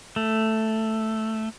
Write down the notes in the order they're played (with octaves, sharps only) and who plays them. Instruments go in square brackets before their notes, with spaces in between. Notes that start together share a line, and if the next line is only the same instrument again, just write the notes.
[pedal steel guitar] A3